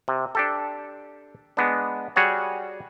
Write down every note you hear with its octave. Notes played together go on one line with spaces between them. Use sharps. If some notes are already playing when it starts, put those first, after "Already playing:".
C3
D4 G4 A4
G#3 B3 D4
G3 F#4 G#4 C#5 F#5